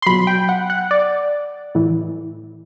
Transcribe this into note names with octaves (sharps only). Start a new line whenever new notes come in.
C6
B2 F#3 B5
G5
F#5
F#5
D5
A2 E3